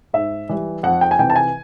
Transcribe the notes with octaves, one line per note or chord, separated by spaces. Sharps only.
G#2 E5
E3 G3
F2 F#5
G5
G#5
C3 E3 G5
A5
G#5